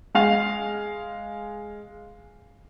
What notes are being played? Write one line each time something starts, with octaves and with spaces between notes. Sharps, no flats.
G#3 F5 F7